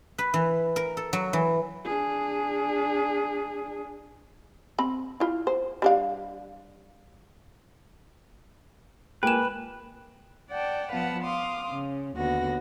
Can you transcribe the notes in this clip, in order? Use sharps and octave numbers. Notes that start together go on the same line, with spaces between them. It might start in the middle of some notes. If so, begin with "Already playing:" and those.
B4
E3
A#4
A4
F#3
E3
D4 G#4
C4 B5
E4 F4
C5
G3 D4 F5
G#3 A#3 B4 G5 G#5 E7
D5 F#5 G5 A5
F3 B3 B4 F5 F#5 A5
F5 C6 D6 D#6
C#3
D#2 D3 B3 F#4 A#6